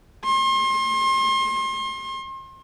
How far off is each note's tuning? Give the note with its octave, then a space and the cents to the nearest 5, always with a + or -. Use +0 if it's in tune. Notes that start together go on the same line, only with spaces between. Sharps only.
C6 +35